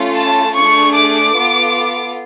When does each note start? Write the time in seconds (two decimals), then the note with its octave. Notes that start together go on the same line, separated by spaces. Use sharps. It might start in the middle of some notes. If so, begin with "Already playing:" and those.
Already playing: A3 C#4 F4 A4
0.16 A5
0.55 A3 D4 G#4 C#6
0.95 D6
1.34 B3 F4 A4